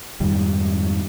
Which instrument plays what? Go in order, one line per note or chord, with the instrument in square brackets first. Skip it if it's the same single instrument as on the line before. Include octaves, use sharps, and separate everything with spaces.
[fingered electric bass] F2 G#2 D#3 G3